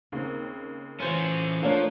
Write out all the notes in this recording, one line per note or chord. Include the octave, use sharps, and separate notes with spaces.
D#2 C#3 A#3 C4
E3 C#4 F4 C5 C#5
F3 A3 A#3 D4 A4 C#5